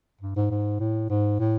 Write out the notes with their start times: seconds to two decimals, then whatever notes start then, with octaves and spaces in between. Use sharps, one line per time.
0.21 G2
0.36 G#2
0.51 G#2
0.80 A2
1.10 G#2
1.40 A2